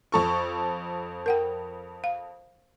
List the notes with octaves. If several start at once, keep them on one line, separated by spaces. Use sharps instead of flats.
F2 A4 C#6
A#4 F#5 G5
F5